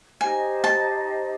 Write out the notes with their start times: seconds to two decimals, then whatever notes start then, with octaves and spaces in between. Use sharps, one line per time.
0.20 D#4 G4 C5 D#5 G#5
0.64 A5